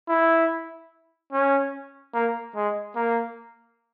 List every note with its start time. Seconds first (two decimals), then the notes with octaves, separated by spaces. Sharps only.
0.08 E4
1.32 C#4
2.14 A#3
2.56 G#3
2.96 A#3